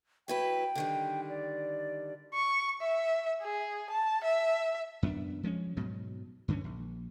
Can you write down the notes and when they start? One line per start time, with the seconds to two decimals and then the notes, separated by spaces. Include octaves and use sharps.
0.28 F#3 E4 B4 G5
0.75 D3 D#3 G3
1.29 D5
2.33 C#6
2.81 E5
3.42 G#4
3.90 A5
4.24 E5
5.03 F#2 B3 C#4 D4
5.43 F3 G#3 A#3 C#4
5.77 G#2 B2 F#3
6.48 G2 D3 E3 C#4
6.64 A#1